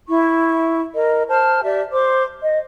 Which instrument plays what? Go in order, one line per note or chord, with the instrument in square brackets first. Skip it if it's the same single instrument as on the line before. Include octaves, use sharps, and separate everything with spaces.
[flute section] E4 C#6
A#4 D#5
C5 A5 F6
G4 D5 E5
C5 C6 D6
D#5